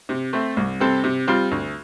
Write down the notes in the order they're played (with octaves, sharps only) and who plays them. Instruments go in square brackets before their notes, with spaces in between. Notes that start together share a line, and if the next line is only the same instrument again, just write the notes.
[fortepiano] C3
A3 C4
C2
C3 G3 C4 A4
C3
G3 C4 F4
D2